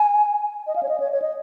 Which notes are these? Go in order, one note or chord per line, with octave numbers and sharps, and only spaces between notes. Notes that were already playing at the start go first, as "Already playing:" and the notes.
Already playing: G#5
D#5
F5
C#5
D#5
C#5
C#5
D#5